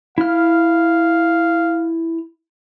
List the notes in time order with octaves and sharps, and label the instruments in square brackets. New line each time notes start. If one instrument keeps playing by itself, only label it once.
[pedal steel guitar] E4 F6 [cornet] F5